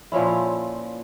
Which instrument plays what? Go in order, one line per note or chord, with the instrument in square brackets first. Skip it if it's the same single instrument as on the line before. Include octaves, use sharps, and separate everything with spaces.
[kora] A#2 F3 C#4 E4